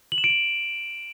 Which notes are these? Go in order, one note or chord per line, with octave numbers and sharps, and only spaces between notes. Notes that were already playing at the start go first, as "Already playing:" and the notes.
F#7
E7
D7
F#7